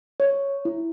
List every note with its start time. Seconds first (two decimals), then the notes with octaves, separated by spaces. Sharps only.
0.20 C#5
0.65 E4